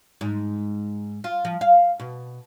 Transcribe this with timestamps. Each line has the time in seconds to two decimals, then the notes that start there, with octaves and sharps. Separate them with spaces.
0.21 G#2
1.24 F4
1.45 F3
1.61 F5
2.00 B2